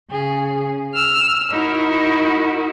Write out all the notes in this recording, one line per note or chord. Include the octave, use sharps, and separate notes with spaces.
C#3 G#4
E6 F6
D#4 E4 F#4 A#4